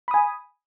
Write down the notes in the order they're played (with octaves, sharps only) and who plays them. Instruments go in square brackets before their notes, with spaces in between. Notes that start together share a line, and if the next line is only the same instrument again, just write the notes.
[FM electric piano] B5
D#6
G#5